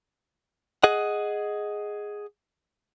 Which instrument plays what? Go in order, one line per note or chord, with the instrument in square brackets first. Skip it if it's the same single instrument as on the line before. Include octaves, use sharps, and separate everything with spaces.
[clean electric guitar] G#4 D#5 F#5